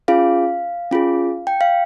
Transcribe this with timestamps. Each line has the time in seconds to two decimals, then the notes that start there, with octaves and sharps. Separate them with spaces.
0.08 C#4 F4 G#4 F5
0.91 C#4 F4 G#4
1.47 G5
1.61 F5